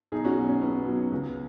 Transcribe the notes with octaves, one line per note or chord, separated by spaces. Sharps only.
B1 D#4 G#4
C#4 F#4
B2 F#3
C#4
B1 B3
B2 F#3
C#2